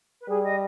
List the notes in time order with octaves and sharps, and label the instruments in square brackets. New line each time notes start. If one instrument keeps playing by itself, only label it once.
[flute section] B4
[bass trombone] G3 [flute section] G#4
[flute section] D#5